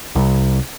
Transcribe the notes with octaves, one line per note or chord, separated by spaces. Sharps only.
C2